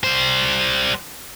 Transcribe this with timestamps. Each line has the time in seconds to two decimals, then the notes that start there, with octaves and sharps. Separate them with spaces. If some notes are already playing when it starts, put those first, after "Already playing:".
0.04 G3 C5